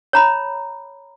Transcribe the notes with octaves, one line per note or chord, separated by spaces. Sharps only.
C#5 A#5 B5